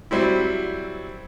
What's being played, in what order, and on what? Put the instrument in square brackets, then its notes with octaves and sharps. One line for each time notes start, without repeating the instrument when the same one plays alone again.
[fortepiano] F#3 G3 C4 E4